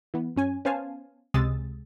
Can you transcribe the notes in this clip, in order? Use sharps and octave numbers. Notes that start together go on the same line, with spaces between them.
E3 B3
F#2 C#4 G#5
B3 C#4 C5 F5 G#5 A5
C#2 C3 G#3 D#6 E6 A6